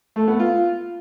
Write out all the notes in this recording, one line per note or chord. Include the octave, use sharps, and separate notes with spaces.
A3
B3
F4